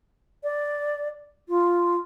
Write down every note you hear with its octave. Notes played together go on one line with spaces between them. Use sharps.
D5
F4